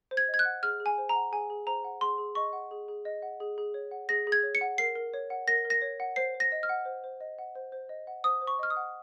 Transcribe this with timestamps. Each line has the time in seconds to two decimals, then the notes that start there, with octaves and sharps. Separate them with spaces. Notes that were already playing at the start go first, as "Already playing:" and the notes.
0.11 C5
0.17 G#6
0.28 D#5
0.34 G#6
0.39 F#6
0.45 F#5
0.63 G#4 F6
0.80 G#4
0.86 G#5
0.98 C5
1.09 A#5
1.15 F#5
1.32 G#4 G#5
1.50 G#4
1.67 C5 A#5
1.84 F#5
2.01 G#4 C6
2.18 G#4
2.35 D#5 C#6
2.53 F#5
2.71 G#4
2.88 G#4
3.05 D#5
3.22 F#5
3.40 G#4
3.58 G#4
3.74 C#5
3.91 F#5
4.09 G#4 A#6
4.27 G#4
4.32 G#6
4.43 C#5
4.55 C#7
4.61 F#5
4.78 A#4 C7
4.95 A#4
5.14 C#5
5.30 F#5
5.48 A#4 A#6
5.65 A#4
5.70 A#6
5.82 C#5
6.00 F#5
6.16 C5 C7
6.34 C5
6.40 A#6
6.52 D#5
6.63 F6
6.69 F#5
6.85 C5
7.04 C5
7.20 D#5
7.39 F#5
7.55 C5
7.72 C5
7.89 D#5
8.07 F#5
8.24 C5 D#6
8.42 C5
8.47 C#6
8.59 D#5 F6
8.70 D#6
8.76 F#5